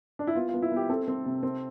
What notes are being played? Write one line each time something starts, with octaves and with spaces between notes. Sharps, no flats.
D4
E4
B3 F4
F4
B3
E4
B3 G4
C4 A4
C4
C3
C4